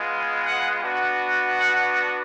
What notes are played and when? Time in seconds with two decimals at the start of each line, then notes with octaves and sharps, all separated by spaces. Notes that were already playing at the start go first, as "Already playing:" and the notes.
Already playing: G#3 B3 F4
0.45 F#5
0.84 B3 D4 F#4
1.60 F#5